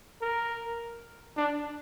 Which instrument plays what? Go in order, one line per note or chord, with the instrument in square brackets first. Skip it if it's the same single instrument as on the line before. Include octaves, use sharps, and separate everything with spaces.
[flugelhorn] A#4
D4